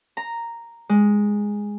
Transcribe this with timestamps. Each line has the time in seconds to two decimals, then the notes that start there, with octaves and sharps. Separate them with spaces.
0.17 A#5
0.89 G#3